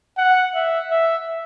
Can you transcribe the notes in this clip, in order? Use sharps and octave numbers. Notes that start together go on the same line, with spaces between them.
F#5
E5
E5